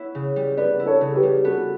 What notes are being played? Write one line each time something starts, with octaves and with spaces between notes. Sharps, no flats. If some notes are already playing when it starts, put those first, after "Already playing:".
Already playing: B3 E4 C#5
C#3
G3
B3 B4 D5
E4
A4 C#5
C#3
G4 B4
G3
B3 F#4 A4